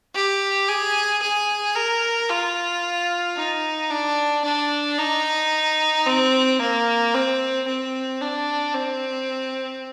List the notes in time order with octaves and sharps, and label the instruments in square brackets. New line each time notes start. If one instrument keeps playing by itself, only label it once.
[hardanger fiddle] G4
G#4
G#4
A#4
F4
D#4
D4
D4
D#4
C4
A#3
C4
C4
D4
C4